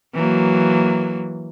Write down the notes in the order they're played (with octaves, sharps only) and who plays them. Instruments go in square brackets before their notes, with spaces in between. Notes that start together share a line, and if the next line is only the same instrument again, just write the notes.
[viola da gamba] E3 F#3 A#3